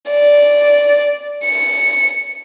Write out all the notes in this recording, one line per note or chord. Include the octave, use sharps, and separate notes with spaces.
D5
C#7